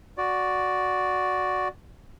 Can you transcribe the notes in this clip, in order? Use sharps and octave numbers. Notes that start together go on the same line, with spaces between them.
F#4 D5